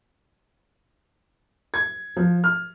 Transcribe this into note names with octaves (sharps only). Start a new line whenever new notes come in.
G#6
F3
F6